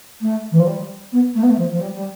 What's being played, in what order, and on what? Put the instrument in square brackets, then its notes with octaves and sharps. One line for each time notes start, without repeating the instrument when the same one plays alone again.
[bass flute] A3
E3
F3
G3
B3
A3
B3
A3
F3
F3
G3
G3